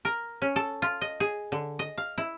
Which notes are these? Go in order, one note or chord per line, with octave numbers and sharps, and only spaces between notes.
A#4
C#4
A4
F4
D#5
G#4
D3
D#5
F5
E4